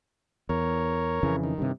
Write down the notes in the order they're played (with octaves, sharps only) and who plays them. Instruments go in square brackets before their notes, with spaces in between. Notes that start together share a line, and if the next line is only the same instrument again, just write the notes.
[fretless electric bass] E2 [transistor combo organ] A#4 C#5
[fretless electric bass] F2 C#3 E3
[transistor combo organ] D#3
[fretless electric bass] G2 C3